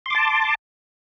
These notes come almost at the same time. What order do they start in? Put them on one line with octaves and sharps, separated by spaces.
C6 D6 A5